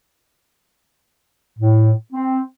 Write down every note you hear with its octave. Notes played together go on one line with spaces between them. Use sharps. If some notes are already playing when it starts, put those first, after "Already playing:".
A2
C4